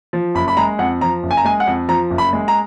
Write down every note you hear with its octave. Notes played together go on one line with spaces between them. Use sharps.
F3
F#1 B5
B5
G#3 A#5
F2 F#5
F3 A#5
F#1
G#5
A#5
G#3 G#5
F#5
F2
F3 A#5
F#1
B5
G#3
A#5